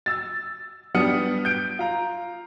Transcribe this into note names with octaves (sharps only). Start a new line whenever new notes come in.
E6 A6
G3 B3 D4 D#6 F6 C#7
G6 D7
F4 A#5